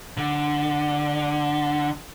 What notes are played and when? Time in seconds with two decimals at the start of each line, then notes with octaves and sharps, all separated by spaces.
0.18 D3